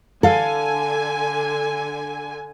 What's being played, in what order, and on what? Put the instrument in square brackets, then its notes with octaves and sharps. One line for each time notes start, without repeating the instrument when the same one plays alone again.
[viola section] D3 G#5 [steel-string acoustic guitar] A4 F5